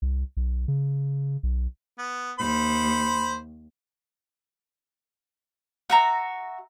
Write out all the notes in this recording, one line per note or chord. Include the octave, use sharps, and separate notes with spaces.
C2
B1
C#3
B1
B3
D#2 C5 B5
F#4 E5 A#5